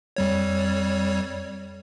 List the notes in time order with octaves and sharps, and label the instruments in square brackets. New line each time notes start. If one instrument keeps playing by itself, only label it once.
[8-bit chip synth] F2 G3 C#5